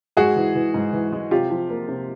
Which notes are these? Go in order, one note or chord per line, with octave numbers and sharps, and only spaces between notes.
G#2 F#4 G#4
E3
E3
G#2
E3
G#3
C3 F4 G4
F3
A#3
C3